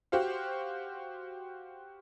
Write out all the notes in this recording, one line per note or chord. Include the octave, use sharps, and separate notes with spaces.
F#4 G4 C5 F5